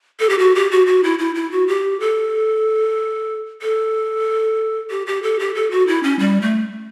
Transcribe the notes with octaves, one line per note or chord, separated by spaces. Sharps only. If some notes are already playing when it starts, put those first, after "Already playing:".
A4
G4
F#4
G4
F#4
F#4
E4
E4
E4
F#4
G4
A4
A4
G4
G4
A4
G4
A4
F#4
E4
C#4
G3
A3